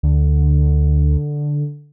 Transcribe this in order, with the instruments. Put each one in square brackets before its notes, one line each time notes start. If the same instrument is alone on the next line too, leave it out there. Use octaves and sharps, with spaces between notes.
[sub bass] D2 [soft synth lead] D3